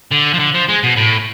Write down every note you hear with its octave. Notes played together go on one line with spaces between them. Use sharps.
D3
F3
D3
F3
G#3
B2
A2